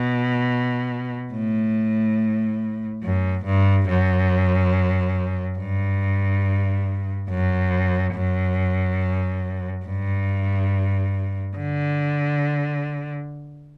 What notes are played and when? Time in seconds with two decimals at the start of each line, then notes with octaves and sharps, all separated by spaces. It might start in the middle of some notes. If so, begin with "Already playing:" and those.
Already playing: B2
1.33 A2
3.03 F#2
3.45 G2
3.89 F#2
5.59 G2
7.30 F#2
8.15 F#2
9.86 G2
11.57 D3